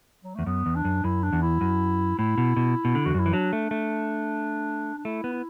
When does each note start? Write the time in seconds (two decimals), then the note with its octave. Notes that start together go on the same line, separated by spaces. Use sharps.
0.23 F#3
0.35 E2 A3
0.46 F#2 B3
0.66 E2
0.76 D4
0.85 F#2
1.04 F#2 E4
1.23 D4
1.33 E2
1.42 E4
1.61 F#2
2.18 A2 E4
2.38 B2
2.56 B2
2.85 B2
2.95 D3
3.06 E2 F#4
3.14 F#2 E4
3.26 E3
3.33 F#3 D4
3.53 A3
3.71 A3
4.98 D4
5.05 A3 E4
5.24 B3
5.33 E4